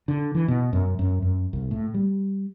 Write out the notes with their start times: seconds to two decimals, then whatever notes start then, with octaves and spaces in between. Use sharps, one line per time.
0.08 D3
0.35 E3
0.48 B2
0.73 F#2
0.99 F#2
1.22 F#2
1.53 C2
1.71 A2
1.94 G3